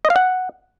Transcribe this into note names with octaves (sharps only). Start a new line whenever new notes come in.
D#5
F5
F#5